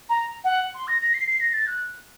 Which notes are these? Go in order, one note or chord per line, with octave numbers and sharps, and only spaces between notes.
A#5
F#5
C6
A#6
A#6
C7
C7
A#6
A6
F#6